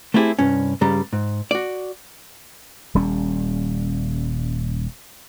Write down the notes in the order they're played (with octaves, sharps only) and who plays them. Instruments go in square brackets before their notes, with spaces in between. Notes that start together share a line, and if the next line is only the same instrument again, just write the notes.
[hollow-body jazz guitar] A3 B3 C4 E4 G4 G#4
C2 G2 C#4
G2 C#3 G3 A#5
G#2
F#4 D5
[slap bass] D#1 G3 C#4